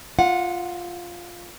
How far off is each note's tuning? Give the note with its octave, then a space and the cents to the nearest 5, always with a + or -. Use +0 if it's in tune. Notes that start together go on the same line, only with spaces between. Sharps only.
F4 +0 F#5 -20